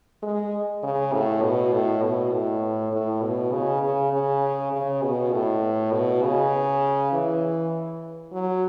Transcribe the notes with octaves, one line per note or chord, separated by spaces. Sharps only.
G#3
C#3
A2
B2
A2
B2
A2
A2
B2
C#3
C#3
C#3
C#3
B2
A2
B2
C#3
E3
F#3